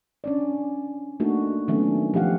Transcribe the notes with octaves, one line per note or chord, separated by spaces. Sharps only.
C#4 D4 D5
A3 A#3 D4 D#4 F#4
D#3 F#3 A3 B3 C#4 D4
F3 A3 G4 F5 F#5